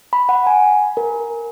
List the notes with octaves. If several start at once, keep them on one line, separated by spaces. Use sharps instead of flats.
B5
F#5
G#5
A#4